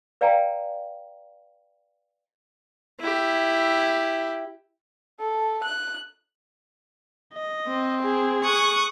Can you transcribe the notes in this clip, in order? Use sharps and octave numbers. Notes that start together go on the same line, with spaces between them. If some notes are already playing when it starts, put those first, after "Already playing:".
B4 D5 F5 G5 G#5 A#5
E4 G4
A4
F#6
D#5
C4
G#4
C#6 D#6 F#6